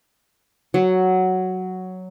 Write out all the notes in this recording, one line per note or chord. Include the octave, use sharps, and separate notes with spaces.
F#3